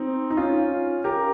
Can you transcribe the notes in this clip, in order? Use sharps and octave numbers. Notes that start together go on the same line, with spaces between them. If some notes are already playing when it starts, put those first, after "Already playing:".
Already playing: C4 D#4
D#4
C#4 F4
G4 A#4